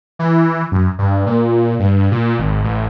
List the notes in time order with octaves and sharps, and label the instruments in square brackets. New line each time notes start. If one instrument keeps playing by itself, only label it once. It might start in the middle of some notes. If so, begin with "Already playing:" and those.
[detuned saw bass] E3
F#2
G2
A#2
G2
A#2
G#1
A1